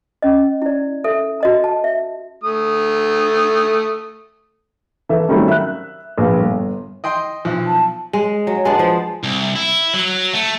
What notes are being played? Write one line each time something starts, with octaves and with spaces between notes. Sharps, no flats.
C#4 D#5
E4 D5
A4 E5
F#4 D#5 A#5
A5
E5
A3 D#6
E3 A4 E5
D#3 F#3 G3 A3 C4 C#4
E5 F#6
A#1 B3 F5
G1
D#5 G5 C6
B1 F3
A5
G#3
F#3
G#3 B3 D4
F3
C2
E4
F#3
A3